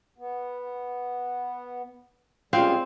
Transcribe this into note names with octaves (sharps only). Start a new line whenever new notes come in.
B3
G3 G#3 C4 C#4 F4 F5